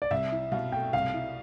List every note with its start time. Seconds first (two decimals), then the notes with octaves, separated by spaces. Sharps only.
0.02 D5
0.11 C2 E5
0.32 E4
0.52 B2 F5
0.72 A3 G5
0.93 C2 F5
1.14 E4